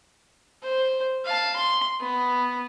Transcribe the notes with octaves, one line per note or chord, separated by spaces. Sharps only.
C5
F5 A5
C6
B3